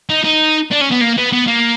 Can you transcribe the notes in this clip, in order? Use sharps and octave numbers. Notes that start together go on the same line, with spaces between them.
D#4
D#4
D4
C#4
B3
A#3
B3
B3
A#3